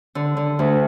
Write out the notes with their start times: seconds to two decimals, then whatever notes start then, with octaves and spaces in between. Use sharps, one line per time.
0.15 D3
0.37 D3
0.59 D2